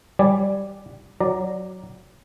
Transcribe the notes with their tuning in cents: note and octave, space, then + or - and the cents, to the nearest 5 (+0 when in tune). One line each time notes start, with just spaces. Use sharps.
G3 +0 D5 +0 G#5 +0
F#3 +0 D5 +0 A#5 +0